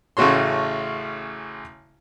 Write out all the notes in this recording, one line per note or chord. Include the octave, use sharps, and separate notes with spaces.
A1 C#3 A3 F#4 C#5 C6